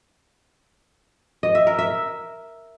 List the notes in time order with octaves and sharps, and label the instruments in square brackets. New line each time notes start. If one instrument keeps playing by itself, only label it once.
[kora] D#5
E5
A#4
E5